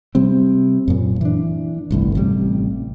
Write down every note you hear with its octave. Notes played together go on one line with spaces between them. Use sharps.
C3 G3 C4
F#2 A#2
E3 D4
G1 C2 A2
A1 C3 E3 G3